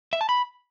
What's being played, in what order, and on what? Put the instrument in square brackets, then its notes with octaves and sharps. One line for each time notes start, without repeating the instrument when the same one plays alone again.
[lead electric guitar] E5
A5
B5